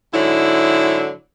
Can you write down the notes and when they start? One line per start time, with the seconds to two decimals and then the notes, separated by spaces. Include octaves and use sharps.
0.13 G#2 D3 F#3 E4